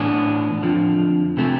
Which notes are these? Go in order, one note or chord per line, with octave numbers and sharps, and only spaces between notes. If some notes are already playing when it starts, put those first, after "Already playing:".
Already playing: A2 E3 B3 D4
F2 D3 F3
C3 E3 A3